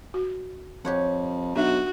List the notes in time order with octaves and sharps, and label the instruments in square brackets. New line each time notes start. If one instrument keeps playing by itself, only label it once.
[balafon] F#4
[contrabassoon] F2 [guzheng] G4 C#5 F#5
[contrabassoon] B1 [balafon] D4 E5 [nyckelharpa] F#4